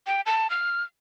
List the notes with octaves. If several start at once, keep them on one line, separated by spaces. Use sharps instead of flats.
G5
A5
F6